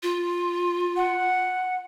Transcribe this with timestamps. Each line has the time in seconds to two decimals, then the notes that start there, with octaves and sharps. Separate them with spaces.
0.03 F4
0.96 F#5